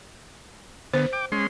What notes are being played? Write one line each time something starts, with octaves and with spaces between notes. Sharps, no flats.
D3 B3 C5
G5 D6
G#3 C#4 C6